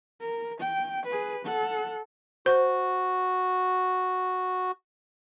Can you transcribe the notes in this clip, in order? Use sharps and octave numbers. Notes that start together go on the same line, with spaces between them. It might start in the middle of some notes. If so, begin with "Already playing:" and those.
A#4
G5
G#4 B4
A4 F#5
F#4 C5